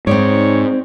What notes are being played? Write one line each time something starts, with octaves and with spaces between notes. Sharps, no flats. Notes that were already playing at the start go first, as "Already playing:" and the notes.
G#2 C4 D#4 C#5 D5